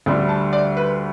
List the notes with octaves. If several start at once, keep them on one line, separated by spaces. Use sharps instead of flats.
D2 D3 G3
A5
D5
B4